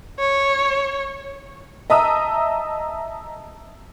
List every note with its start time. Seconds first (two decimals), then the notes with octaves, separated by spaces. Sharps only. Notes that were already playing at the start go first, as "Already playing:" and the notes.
0.19 C#5
1.90 D#5 E5 A5 A#5 D#6 E6